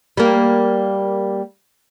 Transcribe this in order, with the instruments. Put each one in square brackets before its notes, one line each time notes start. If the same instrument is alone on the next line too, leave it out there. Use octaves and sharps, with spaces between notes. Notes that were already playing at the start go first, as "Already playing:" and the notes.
[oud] G3 A#3